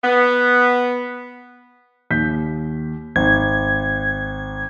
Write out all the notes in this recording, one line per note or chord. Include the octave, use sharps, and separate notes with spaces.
B3
D#2 G6 B6
G#1 G#6